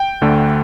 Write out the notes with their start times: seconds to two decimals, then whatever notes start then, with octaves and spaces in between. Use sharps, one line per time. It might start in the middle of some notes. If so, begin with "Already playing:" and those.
Already playing: G5
0.21 D2 D3 A3 D4